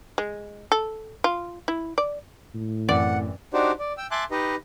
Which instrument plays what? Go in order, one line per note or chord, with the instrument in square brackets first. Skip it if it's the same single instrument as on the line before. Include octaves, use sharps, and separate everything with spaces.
[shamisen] G#3
A4
F4
E4
D5
[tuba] A2
[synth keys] F#2 E3 C4 [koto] D5 [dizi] F#5
[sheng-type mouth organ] D4 D#4 F#4 G4 C5 D5
D5
G5 E6
E5 G#5 A5 C6 D6 F#6
D#4 G4 B4 D#5